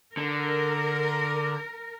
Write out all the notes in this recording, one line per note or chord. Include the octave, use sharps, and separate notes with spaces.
D3 A#4